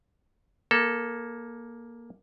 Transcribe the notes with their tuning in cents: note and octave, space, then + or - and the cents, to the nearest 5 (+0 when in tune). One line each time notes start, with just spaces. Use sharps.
A#3 +10 A4 -5